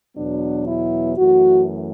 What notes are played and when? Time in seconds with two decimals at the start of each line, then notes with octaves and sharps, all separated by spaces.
0.16 E2 B2 F#3 B3 D4
0.67 E4
1.17 F#2 E3 A3 F#4